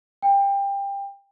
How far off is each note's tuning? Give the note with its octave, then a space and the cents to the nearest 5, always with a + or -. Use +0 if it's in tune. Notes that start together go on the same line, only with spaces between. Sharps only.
G5 +25